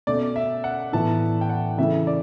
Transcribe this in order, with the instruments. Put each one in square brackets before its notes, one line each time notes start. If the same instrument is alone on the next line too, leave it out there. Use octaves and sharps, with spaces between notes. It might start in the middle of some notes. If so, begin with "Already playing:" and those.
[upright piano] B2 A3 C#4 [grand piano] D5
[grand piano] E5
F#5
[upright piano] A2 E3 B3 E4 [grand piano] A5
[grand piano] G5
F#5
[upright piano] C#3 E3 A3 E4 [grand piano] E5
[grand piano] D5